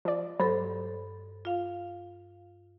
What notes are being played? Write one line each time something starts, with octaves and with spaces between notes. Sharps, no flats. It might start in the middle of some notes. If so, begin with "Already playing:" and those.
F3 D5
G2 F#3 A4 C5
F4 F5